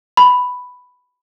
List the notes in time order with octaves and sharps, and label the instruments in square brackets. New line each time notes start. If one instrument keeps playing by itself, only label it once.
[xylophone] B5